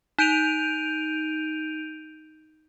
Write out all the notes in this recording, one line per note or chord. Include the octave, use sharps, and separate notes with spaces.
D#4 G6 D7 D#7 F7